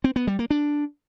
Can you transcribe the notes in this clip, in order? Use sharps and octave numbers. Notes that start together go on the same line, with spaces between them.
C4
B3
G3
A#3
D4